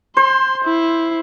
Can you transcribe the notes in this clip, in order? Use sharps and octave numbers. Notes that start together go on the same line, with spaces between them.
C5 C6
E4